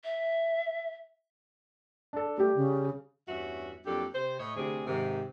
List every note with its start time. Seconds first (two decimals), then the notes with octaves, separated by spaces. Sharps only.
0.04 E5
2.13 D4 A4
2.38 G3 A3 G4
2.55 C#3
3.28 E2 G2 C#4 F#4 E5
3.86 F2 F#3 A#3 D4 G4 A4
4.14 C3 C5
4.39 A2 C#5 D#5
4.56 D2 C3 G#4
4.87 G#2 C3 D#3